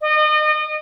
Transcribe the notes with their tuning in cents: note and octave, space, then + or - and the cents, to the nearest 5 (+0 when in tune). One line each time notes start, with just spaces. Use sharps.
D#5 -35